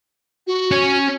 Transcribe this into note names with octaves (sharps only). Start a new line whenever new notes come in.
F#4
C#4